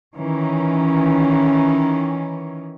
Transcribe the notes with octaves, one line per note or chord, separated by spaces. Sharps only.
D#3 E3 C#4